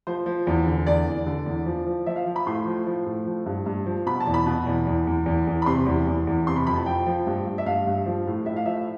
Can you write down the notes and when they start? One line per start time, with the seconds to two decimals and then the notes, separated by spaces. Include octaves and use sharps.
0.07 F3 C5
0.26 F3
0.47 E2
0.66 D3
0.87 E2 D5
1.06 E2
1.26 D3
1.46 E2
1.66 F3
1.87 F3
2.06 F3 E5
2.16 F5
2.26 F3
2.36 B5
2.47 A2 C6
2.67 F3
2.87 F3
3.06 A2
3.27 F3
3.46 G2
3.66 G2
3.86 F3
4.06 B2 B5
4.20 A5
4.27 E2
4.34 B5
4.46 B2
4.67 E2
4.87 E2
5.07 E2
5.26 E2
5.47 E2
5.62 B5
5.66 C3 C6
5.86 E2
6.07 E2
6.27 E2
6.47 C3 C6
6.56 B5
6.67 F2 B5
6.76 A5
6.86 F3 G5
7.06 F3
7.27 G2
7.47 G2
7.58 E5
7.66 G2 F5
7.87 G2
8.06 F3
8.27 A2
8.46 A2 E5
8.56 F5
8.66 F3 E5